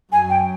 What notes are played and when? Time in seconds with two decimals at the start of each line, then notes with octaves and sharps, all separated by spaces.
0.12 F#2 G#5
0.30 G5